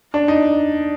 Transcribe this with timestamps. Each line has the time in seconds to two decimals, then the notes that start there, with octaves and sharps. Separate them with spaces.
0.14 D4
0.28 D#4